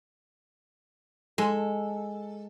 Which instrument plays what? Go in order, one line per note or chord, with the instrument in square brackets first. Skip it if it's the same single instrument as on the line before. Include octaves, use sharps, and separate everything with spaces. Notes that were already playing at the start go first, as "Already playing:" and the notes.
[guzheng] G#3 [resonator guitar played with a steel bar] A4